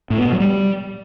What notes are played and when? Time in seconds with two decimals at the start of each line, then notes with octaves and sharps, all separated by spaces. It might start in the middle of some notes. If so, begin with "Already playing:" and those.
0.10 A2
0.18 B3
0.25 B2
0.33 F#3
0.40 G3